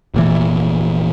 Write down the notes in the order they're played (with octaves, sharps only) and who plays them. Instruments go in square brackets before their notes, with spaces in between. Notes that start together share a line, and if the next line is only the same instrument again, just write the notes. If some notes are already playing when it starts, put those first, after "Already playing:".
[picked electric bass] F1 A#2 E3